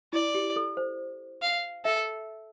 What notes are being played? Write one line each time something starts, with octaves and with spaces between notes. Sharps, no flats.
E4 D5
G4
A4
C5
F5
A4 E5